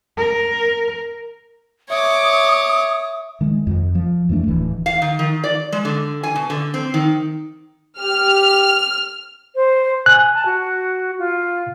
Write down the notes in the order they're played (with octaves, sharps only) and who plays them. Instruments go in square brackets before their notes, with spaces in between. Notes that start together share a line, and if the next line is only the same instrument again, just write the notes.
[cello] A#4
[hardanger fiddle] C#5 D6 [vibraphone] E5 [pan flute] D#6
[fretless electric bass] D#3 G#3
F2
F3
F2 E3 A3 D4
D1 E3
[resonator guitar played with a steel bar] F5
D#3
D#3
D5
G#3
D3
G#5
B2
D3
C4
D#3
[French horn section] G4 [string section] F6
[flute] C5
[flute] G#5 [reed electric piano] F#6
[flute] A5
F#4
F4